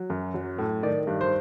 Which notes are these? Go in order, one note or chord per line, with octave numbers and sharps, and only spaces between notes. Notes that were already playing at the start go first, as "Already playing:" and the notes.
Already playing: F#3
F#2
F#3
A2
D#3 D5
G2
C5